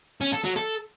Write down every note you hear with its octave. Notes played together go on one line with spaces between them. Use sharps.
C#4
A4
F#3
A4